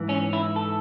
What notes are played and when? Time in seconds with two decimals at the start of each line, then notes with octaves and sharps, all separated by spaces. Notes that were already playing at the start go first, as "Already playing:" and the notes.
Already playing: G#2 E3
0.09 C#4
0.33 E4
0.56 A4